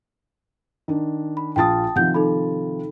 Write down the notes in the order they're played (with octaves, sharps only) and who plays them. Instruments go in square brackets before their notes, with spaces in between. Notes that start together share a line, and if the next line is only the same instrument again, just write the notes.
[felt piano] D#3 D4
[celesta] B5
[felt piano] A#1 F4 A6 [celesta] G5 A5 D#6
[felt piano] C3 D#3 F3 [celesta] F#5 G6
[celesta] D#4 A4 B5